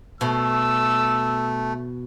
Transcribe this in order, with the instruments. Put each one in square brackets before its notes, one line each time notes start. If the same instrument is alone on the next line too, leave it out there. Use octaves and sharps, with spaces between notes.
[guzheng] B2 [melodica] A3 [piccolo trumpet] E6